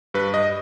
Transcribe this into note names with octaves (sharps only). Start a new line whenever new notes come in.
G2 B4
D#5